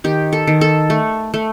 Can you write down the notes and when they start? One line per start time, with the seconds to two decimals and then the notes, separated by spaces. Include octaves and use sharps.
0.04 D#3 G4
0.33 A4
0.47 D#3
0.61 A4
0.90 A3
1.34 A3